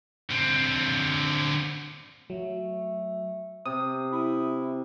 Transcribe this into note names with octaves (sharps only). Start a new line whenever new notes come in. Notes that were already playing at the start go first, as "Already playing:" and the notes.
D3 C4
F#3 A3
C3 D#6
E4